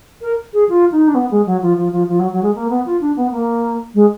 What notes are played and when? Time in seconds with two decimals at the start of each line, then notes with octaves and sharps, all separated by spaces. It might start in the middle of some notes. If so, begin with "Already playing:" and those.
0.22 A#4
0.53 G#4
0.69 F4
0.92 D#4
1.08 D4
1.15 B3
1.31 G#3
1.46 F#3
1.62 F3
1.77 F3
1.92 F3
2.09 F3
2.19 F#3
2.32 F#3
2.43 G#3
2.55 A#3
2.70 B3
2.86 F4
3.01 D4
3.16 B3
3.32 A#3
3.94 G#3